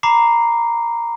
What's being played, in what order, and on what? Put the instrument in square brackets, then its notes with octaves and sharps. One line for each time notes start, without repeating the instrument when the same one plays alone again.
[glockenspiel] A#5 B5 D6 C7